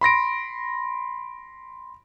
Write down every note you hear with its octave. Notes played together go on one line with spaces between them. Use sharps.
B5 C6 A#6 D7